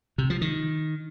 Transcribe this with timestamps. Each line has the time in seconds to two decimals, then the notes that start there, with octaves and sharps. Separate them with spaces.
0.18 C3
0.30 F3
0.41 D#3